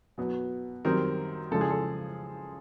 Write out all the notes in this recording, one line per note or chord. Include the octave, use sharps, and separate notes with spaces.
B2 F#3 B3
F#2 D#3 G3 C4 A#4
C#3 F3 G#3 A4
G#4
A4